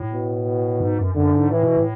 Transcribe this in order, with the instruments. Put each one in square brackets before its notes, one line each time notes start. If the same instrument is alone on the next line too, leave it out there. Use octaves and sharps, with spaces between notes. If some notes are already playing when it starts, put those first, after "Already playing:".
Already playing: [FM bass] A2
[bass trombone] B2
[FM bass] G#2
F#2
[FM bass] F#2 [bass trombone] D3
[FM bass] G#2
[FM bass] A2 [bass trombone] E3
[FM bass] B2
A2